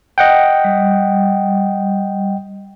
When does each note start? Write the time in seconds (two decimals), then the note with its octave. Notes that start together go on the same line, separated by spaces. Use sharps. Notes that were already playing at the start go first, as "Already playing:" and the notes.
0.18 D#5 F#5 G5
0.64 G3